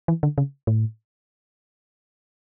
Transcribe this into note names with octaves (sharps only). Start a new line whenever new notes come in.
E3
D3
C#3
A2